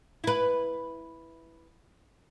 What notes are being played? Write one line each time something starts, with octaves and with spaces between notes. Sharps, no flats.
E4 B4